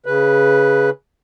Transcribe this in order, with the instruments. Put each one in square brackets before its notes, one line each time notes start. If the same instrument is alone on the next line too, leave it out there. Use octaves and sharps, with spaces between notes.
[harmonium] C#3 B4